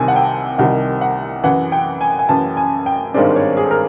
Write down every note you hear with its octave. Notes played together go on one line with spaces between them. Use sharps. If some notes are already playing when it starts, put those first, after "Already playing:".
Already playing: C2 C3 D#3 G#5 A5
F#5
G5
C2 C3 D#3 F#5
F#5
F#2 C#3 E3 F#5
G5
G#5
G#5
F#2 C#3 E3 A5
G#5
G5
G#1 G2 D#3 G#3 C4 D5
C#5
G#4
A4
A#4